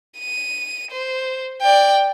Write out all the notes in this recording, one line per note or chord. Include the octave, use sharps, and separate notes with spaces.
D#7
C5
D5 G5